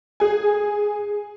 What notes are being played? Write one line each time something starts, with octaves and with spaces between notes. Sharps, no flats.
G#4 G#5